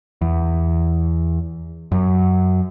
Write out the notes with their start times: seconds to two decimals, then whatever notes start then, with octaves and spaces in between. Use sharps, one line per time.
0.21 E2
1.92 F#2